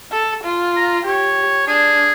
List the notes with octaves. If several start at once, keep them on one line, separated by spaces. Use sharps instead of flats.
A4
F4
A#5
G4 C#5
D4 G#4